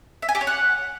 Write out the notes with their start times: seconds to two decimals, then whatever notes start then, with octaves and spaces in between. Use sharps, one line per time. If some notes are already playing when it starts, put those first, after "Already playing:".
0.22 E5
0.29 G#5
0.35 G4
0.41 C#5
0.47 F#5